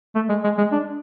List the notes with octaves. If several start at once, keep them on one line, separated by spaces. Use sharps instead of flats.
A3
G#3
G#3
G#3
D4